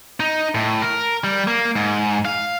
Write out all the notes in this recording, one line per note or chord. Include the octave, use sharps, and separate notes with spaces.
D#4
A2
A#4
G3
A#3
G#2
F5